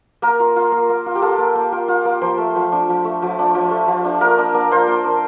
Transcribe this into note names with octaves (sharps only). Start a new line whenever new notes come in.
A#3 A#4
F4
F4
A#3
A#3
F4
G4
F4 A4
A#3
A#3
F4
F4
A#3
F3 C5
A3
F3
D4
F3
A3
F3
D4
F3
A3
F3
D4
A#3 A#4
D4
A#3
F4 C5
A#3
D4